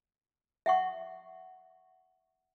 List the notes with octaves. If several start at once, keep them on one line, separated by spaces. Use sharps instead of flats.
E5 F#5 C#6